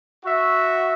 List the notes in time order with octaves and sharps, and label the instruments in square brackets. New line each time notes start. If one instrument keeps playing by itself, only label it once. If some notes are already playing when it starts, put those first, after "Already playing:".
[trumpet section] F#4 E5